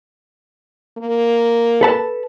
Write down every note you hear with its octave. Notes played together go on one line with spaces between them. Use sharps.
A#3
A4 B4 A5